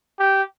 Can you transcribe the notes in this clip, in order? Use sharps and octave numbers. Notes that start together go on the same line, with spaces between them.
G4